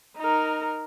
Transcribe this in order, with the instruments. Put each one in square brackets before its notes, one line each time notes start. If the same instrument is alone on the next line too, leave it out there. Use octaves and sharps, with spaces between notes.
[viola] D#4 A#4